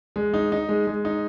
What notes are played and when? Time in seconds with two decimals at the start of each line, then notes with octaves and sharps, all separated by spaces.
0.16 G#3
0.34 D#4
0.52 D#4
0.69 G#3
0.87 G#3
1.05 D#4